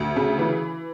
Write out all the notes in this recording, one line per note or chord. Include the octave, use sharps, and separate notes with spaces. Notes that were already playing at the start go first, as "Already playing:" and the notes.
Already playing: D2
C#3
E3